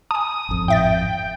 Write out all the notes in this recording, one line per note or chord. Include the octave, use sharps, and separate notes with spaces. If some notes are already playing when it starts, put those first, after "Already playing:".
G#5 A5 D#6
G#1 F2
A2 E5 G5 A6